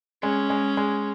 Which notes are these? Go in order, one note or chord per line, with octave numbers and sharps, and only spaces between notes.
G#3 C#4
G#3
G#3